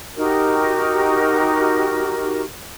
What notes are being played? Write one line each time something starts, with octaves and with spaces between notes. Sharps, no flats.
D#4 F#4 G4 A#4